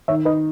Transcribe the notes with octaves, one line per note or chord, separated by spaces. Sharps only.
D#3 C#5 E5
D#4 B4 D#5